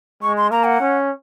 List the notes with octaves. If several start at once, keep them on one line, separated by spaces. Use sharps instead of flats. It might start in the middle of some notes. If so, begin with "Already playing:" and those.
G#3 C#6
C6
A#3 A#5
F#5
C#4